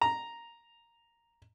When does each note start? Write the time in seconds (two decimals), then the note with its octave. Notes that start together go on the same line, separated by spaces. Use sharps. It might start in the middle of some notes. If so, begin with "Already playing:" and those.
0.02 A#5